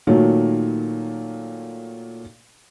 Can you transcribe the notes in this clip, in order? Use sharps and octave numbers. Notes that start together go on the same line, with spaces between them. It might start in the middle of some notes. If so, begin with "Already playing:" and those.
A#2 D#3 F#3 A3